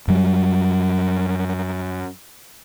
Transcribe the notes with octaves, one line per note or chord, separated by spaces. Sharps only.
F#2 F#3 G3